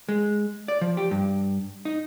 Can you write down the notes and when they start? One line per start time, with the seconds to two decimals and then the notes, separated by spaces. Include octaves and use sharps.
0.09 G#3
0.68 D5
0.81 F3
0.97 G4
1.11 G2
1.85 D#4